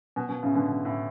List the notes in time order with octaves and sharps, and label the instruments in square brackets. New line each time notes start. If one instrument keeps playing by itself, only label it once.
[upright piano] B2
B2
A2 C#3
B2 D3
B2
A2